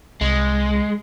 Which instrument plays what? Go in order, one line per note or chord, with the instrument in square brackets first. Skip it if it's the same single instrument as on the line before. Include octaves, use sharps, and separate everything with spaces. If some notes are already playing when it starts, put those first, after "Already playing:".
[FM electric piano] C2 [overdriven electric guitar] G#3